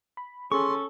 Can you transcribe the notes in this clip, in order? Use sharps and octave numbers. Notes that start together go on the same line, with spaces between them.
B5
C#4 G#4 A4 C6 C#6